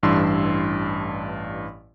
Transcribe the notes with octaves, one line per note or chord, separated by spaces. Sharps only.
A1 G2 E3 D4 C6 E6